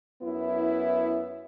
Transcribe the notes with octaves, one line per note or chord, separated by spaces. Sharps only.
F#2 B3 E4